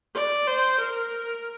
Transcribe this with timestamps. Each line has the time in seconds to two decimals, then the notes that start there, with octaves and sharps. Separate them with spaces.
0.14 D5
0.47 C5
0.80 A#4